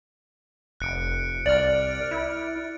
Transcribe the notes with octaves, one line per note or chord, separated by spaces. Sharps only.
F1 F#6 C#7 D7
C2 D5 F6 A6
E4